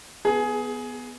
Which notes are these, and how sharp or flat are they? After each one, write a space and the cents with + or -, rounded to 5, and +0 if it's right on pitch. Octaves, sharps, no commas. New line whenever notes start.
B3 +0 G#4 +15